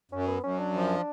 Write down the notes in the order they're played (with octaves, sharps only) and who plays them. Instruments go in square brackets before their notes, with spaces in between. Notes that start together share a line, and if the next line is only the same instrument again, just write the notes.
[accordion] F#2 [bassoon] C#4
[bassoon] B3
[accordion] F#2 [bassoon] C#4
[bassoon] D4
[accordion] F3